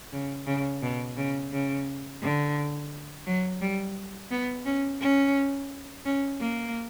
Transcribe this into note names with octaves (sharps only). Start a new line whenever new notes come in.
C#3
C#3
B2
C#3
C#3
D3
F#3
G3
B3
C#4
C#4
C#4
A#3